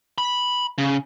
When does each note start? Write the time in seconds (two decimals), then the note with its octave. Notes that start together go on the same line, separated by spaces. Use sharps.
0.18 B5
0.78 C#3